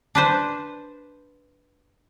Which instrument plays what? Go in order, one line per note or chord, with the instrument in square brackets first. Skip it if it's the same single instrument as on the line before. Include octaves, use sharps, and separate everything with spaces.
[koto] D4 B4 C5